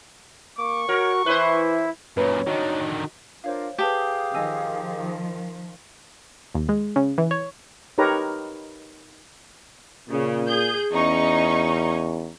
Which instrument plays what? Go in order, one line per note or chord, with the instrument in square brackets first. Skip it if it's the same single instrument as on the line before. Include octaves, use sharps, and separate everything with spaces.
[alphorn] A#3 [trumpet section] C#6 [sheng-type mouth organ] D6
[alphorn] F#4 [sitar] A#4 [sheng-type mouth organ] C#5
[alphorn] E3 [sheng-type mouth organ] E4 [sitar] B4 C5
[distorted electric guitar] F#2 A#2 [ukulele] B4 [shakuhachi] C#5
[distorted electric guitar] D3 D#3 [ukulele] F#4 D#5
[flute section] D4 F4 A#4 [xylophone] C5 C#5 F5
[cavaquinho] G4 [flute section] G#4 F5 D#6 [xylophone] B4 A5 B6
[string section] D#3 F3 [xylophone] D#5 G#5 E6
[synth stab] D#2
G#3
C#3
E3
C#5
[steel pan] D#4 G4 A#4 B4 C#5 A#5
[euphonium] A#2 [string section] C#3
[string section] G#4 G6
[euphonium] E2 [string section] C#4 D#4 C#6